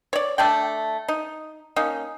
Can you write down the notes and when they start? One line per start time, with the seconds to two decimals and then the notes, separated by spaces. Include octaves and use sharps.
0.13 C#5 D5
0.38 A3 D4 D5 G5
1.08 D#4
1.76 A#3 C#4 D#4